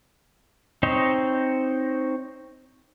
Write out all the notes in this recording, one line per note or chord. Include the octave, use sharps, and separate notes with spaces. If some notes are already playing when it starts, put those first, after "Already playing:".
C4 D#4 C5 C#5 D#5